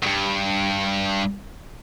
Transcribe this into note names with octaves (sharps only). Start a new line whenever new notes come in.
E2 G2